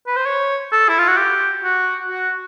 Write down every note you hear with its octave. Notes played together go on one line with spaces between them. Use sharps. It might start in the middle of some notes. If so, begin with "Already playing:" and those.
B4
C5
C#5
A4
E4
F4
F#4
G4
F#4
F#4